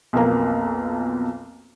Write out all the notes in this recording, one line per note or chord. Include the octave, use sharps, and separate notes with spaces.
B1 F2 B2 A#3 A#5